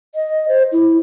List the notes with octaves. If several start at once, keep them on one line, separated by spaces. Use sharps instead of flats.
D#5
C5
E4